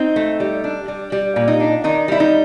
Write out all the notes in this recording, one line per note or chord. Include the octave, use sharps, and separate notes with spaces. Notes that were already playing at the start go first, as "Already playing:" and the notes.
Already playing: C4 D#4
A3
G3
D4
G3
G3
A#2
D#4
D4
D#3 D#4
G3 E4
D#4